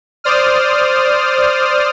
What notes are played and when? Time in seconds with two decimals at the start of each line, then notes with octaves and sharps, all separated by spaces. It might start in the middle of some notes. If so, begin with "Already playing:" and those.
0.24 C5 D5 D#6 F6